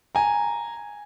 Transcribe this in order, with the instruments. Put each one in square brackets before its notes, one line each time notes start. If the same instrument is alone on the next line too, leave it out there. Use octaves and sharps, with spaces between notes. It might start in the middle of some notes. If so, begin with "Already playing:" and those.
[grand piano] G#5 A#5